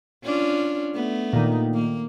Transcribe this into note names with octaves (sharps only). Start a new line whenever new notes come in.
C#4 D4 F4
A3 B3
A#2 D#3
A#3